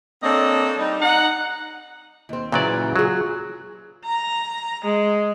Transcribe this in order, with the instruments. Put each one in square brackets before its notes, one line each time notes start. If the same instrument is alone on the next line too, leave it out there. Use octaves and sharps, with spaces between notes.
[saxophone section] A#3 C4 D4 A4 C#5 D#5
G3 D#4
D#4 F#5
[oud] D#2 C4
[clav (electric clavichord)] A#2 F#3 D5 [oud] C#3 E3
[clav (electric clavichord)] F#3 [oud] F4 G#4
[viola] A#5
G#3